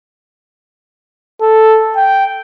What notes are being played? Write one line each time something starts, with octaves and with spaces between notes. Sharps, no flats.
A4
G5